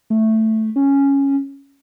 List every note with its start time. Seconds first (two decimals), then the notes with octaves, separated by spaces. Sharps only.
0.10 A3
0.76 C#4